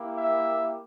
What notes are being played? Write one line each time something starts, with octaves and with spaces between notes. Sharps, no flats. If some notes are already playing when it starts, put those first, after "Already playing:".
Already playing: A#3 E4 G4
E5